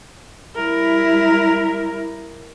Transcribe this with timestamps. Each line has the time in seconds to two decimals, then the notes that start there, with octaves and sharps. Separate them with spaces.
0.56 G3 E4 A#4